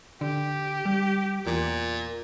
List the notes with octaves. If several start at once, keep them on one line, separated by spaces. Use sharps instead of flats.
D3 G4
G3
E2 A#2